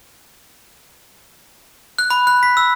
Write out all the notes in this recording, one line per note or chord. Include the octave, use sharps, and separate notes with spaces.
F#6
B5
F#6
B6
E6